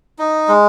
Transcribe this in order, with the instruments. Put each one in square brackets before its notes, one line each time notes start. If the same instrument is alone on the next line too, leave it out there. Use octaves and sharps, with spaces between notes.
[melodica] D#4
G#3